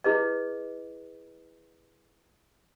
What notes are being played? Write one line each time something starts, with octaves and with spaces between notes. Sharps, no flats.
E4 G#4 B4 D#5